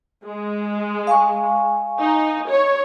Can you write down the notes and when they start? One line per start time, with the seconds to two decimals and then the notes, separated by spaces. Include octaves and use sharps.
0.25 G#3
1.07 F5 G#5 C#6
1.99 D#4
2.49 C#5